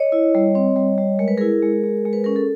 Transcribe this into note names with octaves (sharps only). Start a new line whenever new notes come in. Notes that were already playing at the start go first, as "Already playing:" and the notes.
Already playing: C#5 D#5
E4
G3
C4
G3
G3
G#3 A#4
B4
E4 G#4 A#4
G#3
G#3
G#3
B4
C#4 A#4
A4